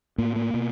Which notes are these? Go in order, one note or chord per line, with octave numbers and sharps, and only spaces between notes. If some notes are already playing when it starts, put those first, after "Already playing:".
A2 A#3
A#3
B2